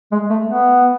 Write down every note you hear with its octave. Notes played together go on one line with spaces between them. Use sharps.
G#3
A3
B3